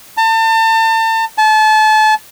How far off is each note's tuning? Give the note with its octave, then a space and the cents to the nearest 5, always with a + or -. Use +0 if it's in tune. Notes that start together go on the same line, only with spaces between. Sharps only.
A5 +35
A5 -30